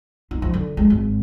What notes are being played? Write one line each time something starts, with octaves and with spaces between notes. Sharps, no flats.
D#4
F3
D3
G#3
G#1